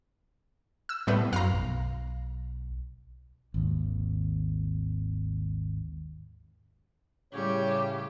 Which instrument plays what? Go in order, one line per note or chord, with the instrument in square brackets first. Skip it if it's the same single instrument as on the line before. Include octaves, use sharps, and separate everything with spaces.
[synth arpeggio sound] E6
A2 G3 B3
[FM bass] F#2 [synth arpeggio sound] F5 A#5
[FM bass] B1
[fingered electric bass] G#1 D#2
[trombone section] A2 C#3 [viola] G3 [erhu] G4 [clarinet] C#5